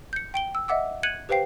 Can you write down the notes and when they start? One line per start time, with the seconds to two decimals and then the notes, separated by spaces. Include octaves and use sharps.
0.13 G6 C#7
0.34 G5 D7 G7
0.55 E6
0.68 D#5 E5 F#5 D6 E6
1.03 F#6 G#6 C#7 D#7 F#7
1.29 G4 B4 C5 F5 G5 C7